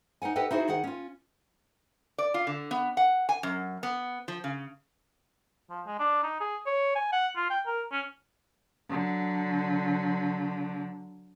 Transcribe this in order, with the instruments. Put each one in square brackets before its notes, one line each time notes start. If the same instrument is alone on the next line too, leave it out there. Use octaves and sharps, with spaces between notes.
[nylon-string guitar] D#4 A#4 F#5 G#5
G4 A4 B4 D#5 F#5 G5
D#4 E4 F#4 G#4 C5
D#3 G#4 F#5
C#4 F4
[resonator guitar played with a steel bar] D5
F4
D3
B3
F#5
G#5
F#2
B3
F3
C#3
[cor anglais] F3
G#3
D4
D#4
G#4
C#5
G#5
F#5
F4
G5
A#4
C#4
[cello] D3 F#3